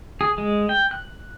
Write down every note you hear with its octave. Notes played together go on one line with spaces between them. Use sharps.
G#4
G#3
G5
F#6